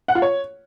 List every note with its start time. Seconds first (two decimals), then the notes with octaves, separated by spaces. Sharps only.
0.08 F#5
0.15 F4
0.22 C#5